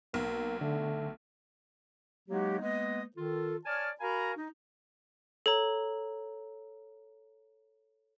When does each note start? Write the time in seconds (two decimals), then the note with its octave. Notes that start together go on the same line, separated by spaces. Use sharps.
0.14 B1 A#3
0.61 D3 A3
2.29 F#3 G#3 A#3 D#4 F#4 G4
2.61 G#3 A#3 B3 B4 D#5
3.16 D#3 F4 A4
3.65 C#5 D5 G#5 A5 F6
4.00 F#4 A#4 F5 G#5 A#5 B5
4.37 D#4
5.46 A4 C#5 A#5